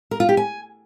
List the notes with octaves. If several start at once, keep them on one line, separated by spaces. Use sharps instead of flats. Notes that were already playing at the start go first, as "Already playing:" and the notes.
A#4
F4
G4
G#5